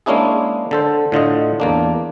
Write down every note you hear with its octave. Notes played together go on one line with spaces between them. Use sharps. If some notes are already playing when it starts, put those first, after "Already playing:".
G#3 A#3 C#4 D4 E4 G#4
D3 A4 C5
A2 D3 F4 D#5
E2 A#3 D4